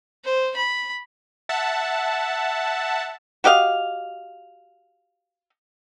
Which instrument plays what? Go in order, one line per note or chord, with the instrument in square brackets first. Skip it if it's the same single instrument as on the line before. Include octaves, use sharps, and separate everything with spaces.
[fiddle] C5
B5
[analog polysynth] E5 F#5 A5
[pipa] F#4 G4 D#5 F5